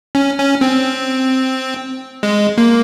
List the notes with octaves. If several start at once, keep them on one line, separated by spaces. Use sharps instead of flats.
C#4
C#4
C4
G#3
A#3